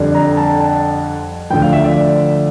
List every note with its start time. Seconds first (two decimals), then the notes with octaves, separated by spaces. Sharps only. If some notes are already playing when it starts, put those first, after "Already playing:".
Already playing: F2 D3 G3
0.15 A#5
0.37 A5
0.60 A5
1.50 D2 D3 F3 G5
1.62 F5
1.73 E5
1.84 D5